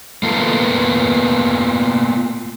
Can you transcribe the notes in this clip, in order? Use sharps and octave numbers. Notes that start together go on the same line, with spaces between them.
A#3 B3 F4 A4